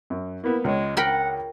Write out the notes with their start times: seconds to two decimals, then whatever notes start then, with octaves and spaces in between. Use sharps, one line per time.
0.10 F#2
0.44 A#3 B3 E4
0.64 C#2 G#3 C#5
0.97 A#4 F#5 G5 B5